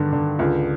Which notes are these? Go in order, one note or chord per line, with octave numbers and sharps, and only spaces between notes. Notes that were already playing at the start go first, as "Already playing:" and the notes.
Already playing: G2 D3 D#3
D3
C#2